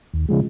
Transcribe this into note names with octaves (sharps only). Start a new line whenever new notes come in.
D#2
C#3 F3 G#3